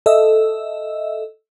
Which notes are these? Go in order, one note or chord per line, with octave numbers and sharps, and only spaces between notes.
A4 D#5 E5 E6